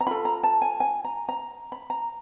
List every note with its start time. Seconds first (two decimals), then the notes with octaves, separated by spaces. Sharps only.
0.01 A#5
0.07 F4 A4 B5
0.25 A#5
0.43 A5
0.62 G#5
0.80 G#5
1.05 A#5
1.29 A#5
1.72 B5
1.90 A#5